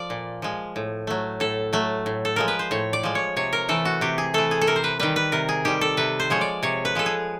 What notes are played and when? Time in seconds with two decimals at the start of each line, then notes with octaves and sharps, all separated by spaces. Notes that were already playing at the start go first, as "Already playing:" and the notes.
Already playing: F3 D5
0.10 A#2
0.42 F3 G#3
0.76 A2
1.07 F#3 A3
1.40 A2 A4
1.73 F#3 A3
2.06 A2
2.25 A4
2.36 F3 G#3 A#4
2.48 B4
2.59 C5
2.71 A2 C#5
2.93 D5
3.03 F3 G#3
3.15 C#5
3.36 C3 C#5
3.53 A#4
3.69 E3 A3 A4
3.85 F#4
4.01 C3 G4
4.18 G#4
4.34 E3 A3 A4
4.51 G#4
4.61 A4
4.67 C3 A#4
4.76 C5
4.84 B4
4.99 D#3 G3 B4
5.16 B4
5.32 C3 A#4
5.49 G#4
5.65 D#3 G3 G4
5.81 A4
5.97 C3 B4
6.20 C5
6.30 F3 G#3 C#5
6.41 D5
6.63 C3 C#5
6.85 B4
6.95 F3 G#3 A4
7.06 G#4